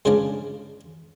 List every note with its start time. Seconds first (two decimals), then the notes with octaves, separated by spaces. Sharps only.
0.05 G2 C#3 F3 G#3 D4 A5